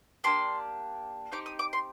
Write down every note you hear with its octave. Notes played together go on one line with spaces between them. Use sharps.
A#3 D4 G4 C6
C4 D#4 G4 D6
D#6
D6
C6